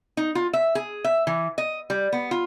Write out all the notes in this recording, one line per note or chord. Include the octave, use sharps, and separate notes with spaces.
D#4
F4
E5
G#4
E5
E3
D#5
G3
B3
F4